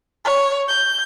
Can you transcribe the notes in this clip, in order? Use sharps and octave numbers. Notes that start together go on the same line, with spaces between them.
C#5
G6